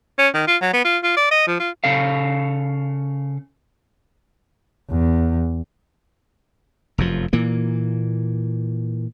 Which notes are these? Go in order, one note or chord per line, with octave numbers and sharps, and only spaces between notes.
C#4
D#3
F4
F#3
B3
F4
F4
D5
D#5
F3
F4
C#3 A4 F5
E2
F1 F#2 F3
A#2 E3 A#3